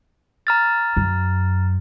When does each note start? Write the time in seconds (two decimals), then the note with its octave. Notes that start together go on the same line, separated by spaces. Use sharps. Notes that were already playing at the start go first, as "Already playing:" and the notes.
0.47 A#5 F6 A6
0.97 F#2